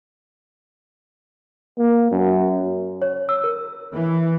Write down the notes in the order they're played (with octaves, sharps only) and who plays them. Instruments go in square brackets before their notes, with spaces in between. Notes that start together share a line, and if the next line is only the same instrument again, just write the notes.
[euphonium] A#3
F#2
[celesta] C#5
E6
A#4
[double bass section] E3